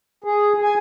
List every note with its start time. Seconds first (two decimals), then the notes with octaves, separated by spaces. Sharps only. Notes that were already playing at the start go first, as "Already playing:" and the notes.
0.24 G#4
0.62 G#5